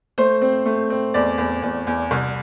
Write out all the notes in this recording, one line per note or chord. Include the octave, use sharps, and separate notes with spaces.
A3 C5
C4
A3
C4
E2 D5
E2
E2
E2
C2